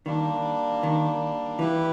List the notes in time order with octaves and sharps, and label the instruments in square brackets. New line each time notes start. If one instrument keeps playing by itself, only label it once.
[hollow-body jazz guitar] D#3 [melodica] G3 A#3 D4
[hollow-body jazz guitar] D#3
[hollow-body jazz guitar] E3 [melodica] E4 G4 B4